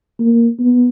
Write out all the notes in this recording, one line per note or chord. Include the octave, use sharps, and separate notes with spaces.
A#3
B3